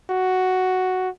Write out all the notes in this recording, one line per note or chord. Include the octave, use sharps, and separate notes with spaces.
F#4